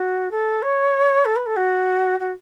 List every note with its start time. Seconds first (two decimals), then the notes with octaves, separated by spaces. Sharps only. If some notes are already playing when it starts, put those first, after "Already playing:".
Already playing: F#4
0.31 A4
0.62 C#5
1.25 A4
1.36 B4
1.46 A4
1.56 F#4
2.19 F#4